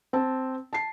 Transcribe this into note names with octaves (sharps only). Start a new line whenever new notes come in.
C4 A5
A5 C7